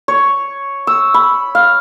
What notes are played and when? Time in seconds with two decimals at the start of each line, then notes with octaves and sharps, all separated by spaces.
0.08 C#5
0.87 E6
1.14 B5
1.55 F5